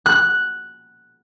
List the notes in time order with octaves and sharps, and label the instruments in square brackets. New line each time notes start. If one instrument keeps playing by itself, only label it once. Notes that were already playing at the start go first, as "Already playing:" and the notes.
[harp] F#6